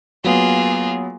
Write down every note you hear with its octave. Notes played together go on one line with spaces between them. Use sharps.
F#3 A#3 B3 F4 G#4